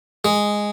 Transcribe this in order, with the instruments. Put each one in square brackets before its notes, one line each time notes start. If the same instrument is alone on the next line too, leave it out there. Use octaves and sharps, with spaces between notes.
[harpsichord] G#3